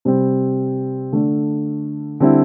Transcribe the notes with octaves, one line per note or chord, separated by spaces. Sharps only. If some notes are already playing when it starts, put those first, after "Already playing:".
C3 G3 C4
D3 A3 D4
D3 G3 C4 E4